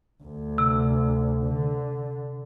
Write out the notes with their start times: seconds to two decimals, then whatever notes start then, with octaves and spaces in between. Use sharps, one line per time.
0.24 D2
0.58 C3
1.45 D3